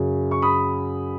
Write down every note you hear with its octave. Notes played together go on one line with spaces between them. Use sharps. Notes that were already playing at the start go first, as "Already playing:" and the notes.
Already playing: F#2 C#3 F#3
C#6
B5 D#6